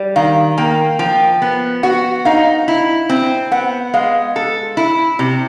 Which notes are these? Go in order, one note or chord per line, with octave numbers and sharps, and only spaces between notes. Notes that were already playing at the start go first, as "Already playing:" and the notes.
Already playing: G3
D#3 F5
A#3 G5
F3 G5
B3
F#4 F#5
D#4 F5
E4
C4
B3 F#5
G#3 F5
A4
E4
C3